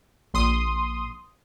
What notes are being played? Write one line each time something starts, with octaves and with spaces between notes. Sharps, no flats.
A#1 C6 D#6